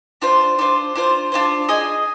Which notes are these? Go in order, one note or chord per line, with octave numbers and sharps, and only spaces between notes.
D4 F4 C5
D4 F4 C5
D4 F4 C5
D4 F4 C5
G#4 D#5 G#5